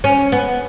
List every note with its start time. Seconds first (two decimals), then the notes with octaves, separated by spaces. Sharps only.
0.04 C#4
0.32 B3